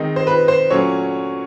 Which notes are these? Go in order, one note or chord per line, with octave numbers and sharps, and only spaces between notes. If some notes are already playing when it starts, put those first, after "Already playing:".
Already playing: D#3 G#3 C4 D#4
C5
B4
C5
A#2 F#3 A3 C#4 C#5